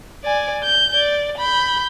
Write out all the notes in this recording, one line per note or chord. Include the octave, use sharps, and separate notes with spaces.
D5 G#5
G6
D5
B5 G6